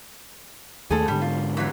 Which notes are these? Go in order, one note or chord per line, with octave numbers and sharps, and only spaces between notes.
D#2 A3 G#4 A4
G#2 D3 G3
F4
F2 E3 F#3